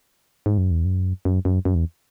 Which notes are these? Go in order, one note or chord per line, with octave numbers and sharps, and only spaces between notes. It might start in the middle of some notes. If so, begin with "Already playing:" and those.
G#2
F#2
E2
F#2
F#2
F#2
F#2
E2